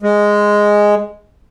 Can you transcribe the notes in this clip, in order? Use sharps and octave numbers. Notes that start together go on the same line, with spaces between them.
G#3